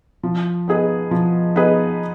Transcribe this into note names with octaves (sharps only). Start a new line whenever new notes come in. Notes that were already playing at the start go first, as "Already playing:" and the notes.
F3
B3 D#4 G#4 B4
F3
B3 D#4 G#4 B4